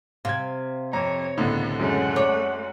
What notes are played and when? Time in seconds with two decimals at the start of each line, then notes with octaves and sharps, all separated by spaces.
0.25 C3 F5 G#6
0.93 F2 C#5 A#5
1.38 C#2 A2 D3 B3 A4
1.79 F#2 G#3 A3 C#4 F#5
2.16 C#5 D6